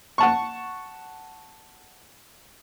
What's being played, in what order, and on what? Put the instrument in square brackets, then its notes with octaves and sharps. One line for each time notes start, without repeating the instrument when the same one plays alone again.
[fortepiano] F#5 A5 C#6